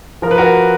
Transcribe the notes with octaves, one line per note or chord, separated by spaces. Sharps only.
F3 A#4
B4
F#4 A#4